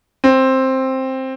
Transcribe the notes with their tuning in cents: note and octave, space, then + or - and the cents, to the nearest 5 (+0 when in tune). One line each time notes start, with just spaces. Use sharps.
C4 +10